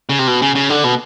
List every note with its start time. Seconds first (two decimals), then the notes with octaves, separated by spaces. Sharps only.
0.09 C#3
0.19 C3
0.27 B2
0.42 C#3
0.55 C#3
0.70 D3
0.84 B2